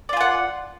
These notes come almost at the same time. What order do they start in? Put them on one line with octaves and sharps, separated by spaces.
D5 F4 G#5 F#5